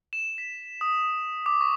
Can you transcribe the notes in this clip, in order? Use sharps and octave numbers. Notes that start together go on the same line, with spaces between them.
E7
B6
D#6
D6
C#6